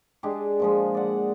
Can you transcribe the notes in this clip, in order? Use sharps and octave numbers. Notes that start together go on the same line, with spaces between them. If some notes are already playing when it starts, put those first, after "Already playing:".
G#3 D4 G4 G#4
A#2 F3 G#3
D5 F#5